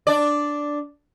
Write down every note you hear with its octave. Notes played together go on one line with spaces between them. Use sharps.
D4 D5